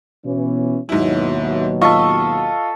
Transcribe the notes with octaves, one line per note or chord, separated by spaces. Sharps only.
B2 E3 C#4
D#2 G#2 B2 F#3 E4
F4 A4 D#5 E5 C#6